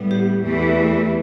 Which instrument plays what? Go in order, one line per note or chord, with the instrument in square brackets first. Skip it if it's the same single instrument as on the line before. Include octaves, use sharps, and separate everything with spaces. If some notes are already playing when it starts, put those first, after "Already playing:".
Already playing: [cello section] A2 G3 B3
[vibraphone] G4
[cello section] E2 E3 A3